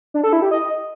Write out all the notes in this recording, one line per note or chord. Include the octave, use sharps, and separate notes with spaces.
D4
A4
E4
G4
D#5